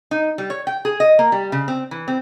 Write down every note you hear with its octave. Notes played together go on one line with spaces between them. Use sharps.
D#4
G3
C#5
G5
G#4
D#5
A#3
G3
C#3
C4
E3
C4